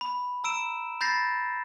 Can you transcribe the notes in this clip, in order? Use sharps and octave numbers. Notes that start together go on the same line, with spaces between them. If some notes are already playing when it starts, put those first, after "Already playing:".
B5
A#5 E6 D7 E7
B5 G6 A6 A#6 C7